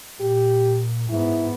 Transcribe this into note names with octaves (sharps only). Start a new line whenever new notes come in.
A#2 G4
G#2 B3 E4